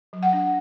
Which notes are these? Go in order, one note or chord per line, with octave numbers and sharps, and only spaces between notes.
F#3
F#5
D4